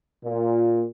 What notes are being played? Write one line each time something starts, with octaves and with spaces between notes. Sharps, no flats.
A#2